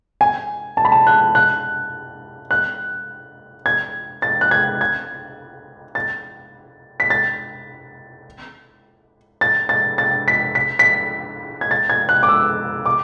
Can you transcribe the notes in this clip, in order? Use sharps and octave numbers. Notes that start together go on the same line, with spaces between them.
G#5
A5
B5
A5
F#6
F#6
F#6
G#6
A6
F#6
G#6
G#6
A6
B6
A6
A6
A6
A6
B6
B6
B6
G#6
A6
G#6
F#6
D6
E6
D6